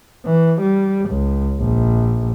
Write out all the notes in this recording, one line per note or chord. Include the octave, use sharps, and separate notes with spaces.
E3
G3
C#2
A#1